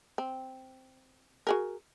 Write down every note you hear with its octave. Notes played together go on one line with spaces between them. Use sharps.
C4
F#4 G#4 A#4